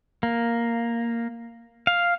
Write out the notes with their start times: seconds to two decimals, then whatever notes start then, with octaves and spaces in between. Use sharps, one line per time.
0.23 A#3
1.87 F5